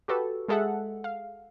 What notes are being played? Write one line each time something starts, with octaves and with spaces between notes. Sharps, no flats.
F#4 G4 A4 B4
G#3 G#4 A4 E5 F#5
F5